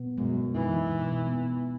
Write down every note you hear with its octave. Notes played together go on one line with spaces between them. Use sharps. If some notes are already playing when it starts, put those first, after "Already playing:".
Already playing: B2 B3
F#2 G#3
E3 D#4
B2
B3